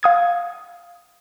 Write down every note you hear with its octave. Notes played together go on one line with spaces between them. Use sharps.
F5 D#6 G#6